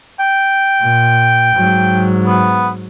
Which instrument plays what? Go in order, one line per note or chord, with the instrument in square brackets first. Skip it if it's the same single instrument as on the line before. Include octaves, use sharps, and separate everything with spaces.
[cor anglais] G5
[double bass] A#2
G#2 F#3
[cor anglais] B3